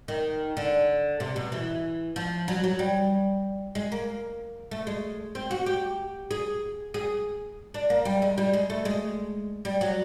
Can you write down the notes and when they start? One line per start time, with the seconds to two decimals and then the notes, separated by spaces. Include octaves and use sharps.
0.08 D#3
0.57 D3
1.20 C3
1.36 B2
1.52 E3
2.16 F3
2.48 F#3
2.64 F#3
2.79 G3
3.75 G#3
3.92 A#3
4.71 A3
4.87 G#3
5.35 C4
5.51 F#4
5.66 G4
6.31 G#4
6.94 G#4
7.74 D4
7.90 A#3
8.05 G3
8.22 G#3
8.38 G3
8.53 G#3
8.70 A3
8.85 G#3
9.65 G3
9.81 F#3